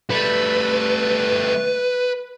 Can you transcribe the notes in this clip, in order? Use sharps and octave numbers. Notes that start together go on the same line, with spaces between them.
G3 A3 B4